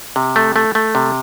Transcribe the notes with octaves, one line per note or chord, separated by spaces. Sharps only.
C3
A3
A3
A3
C3